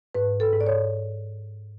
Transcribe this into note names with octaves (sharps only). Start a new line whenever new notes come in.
G#2 B4
A4
G#2
D5
C#5